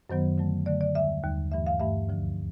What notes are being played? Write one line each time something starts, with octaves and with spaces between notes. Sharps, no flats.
F#2 D#3 F#3 B3 C5
D3 F#3 A3
D3 F#3 A3 D5
D5
D#2 D3 G3 E5
D#2 D3 G3
G2 E3 A3 E5
F5
G2 E3 A3 E5
D2 D3 F3